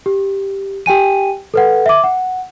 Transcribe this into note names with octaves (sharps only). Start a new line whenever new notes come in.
G4
G4 G5 G#5 D#7
A4 B4 F#5
E5 D6
F#5